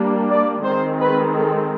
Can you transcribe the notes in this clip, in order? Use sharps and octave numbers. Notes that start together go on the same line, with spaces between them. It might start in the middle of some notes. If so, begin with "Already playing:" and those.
Already playing: G3 A#3 D4
D5
D#3 G#3 C4 C5
B4
A4